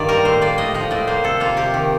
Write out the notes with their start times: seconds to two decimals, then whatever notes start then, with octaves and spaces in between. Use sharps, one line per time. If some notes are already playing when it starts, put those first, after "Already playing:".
Already playing: G2 D#3 A#3 D5
0.09 G3 A#4
0.25 A2 C5
0.41 A#3 D5
0.58 A2 D#5
0.74 F3 D#5
0.91 A2 D5
1.07 A#3 C5
1.24 C3 A4
1.40 A#3 F4
1.57 C3 G4
1.74 D#3